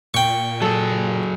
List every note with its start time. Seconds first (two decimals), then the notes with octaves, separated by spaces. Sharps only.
0.14 A#2 G5 C#6
0.62 F#3 G#4 A4